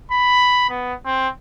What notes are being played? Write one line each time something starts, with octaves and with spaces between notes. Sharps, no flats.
B5
B3
C4